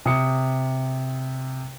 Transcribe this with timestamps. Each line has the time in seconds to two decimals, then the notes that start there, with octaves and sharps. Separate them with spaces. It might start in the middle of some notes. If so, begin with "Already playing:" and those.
0.06 C3 D#6 C#7